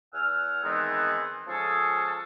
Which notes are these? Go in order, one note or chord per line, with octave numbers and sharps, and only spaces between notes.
E2 F#5 G#5 E6 F6
D#3 E3 G#3 B3 C4 D#4
F3 G#3 C#4 G#4 A4